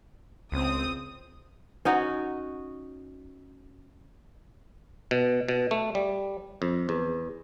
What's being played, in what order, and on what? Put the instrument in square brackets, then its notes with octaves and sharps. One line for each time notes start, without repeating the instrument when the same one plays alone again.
[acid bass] C#2 [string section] C4 D#6
[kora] C#4 D#4 F#4
[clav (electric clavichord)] B2
B2
A3
G3
F2
E2